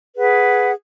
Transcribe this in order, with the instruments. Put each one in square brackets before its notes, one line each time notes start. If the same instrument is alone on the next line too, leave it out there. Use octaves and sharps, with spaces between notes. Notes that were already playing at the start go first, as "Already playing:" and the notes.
[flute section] G#4 B4 F#5